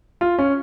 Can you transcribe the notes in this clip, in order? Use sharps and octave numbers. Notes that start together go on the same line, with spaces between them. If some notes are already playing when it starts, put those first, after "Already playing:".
F4
C#4